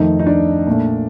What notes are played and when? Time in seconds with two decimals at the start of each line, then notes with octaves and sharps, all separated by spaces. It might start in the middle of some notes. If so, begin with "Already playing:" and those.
Already playing: F2 D#3 A3 D#4
0.19 D#4
0.27 D4
0.67 A#2 A3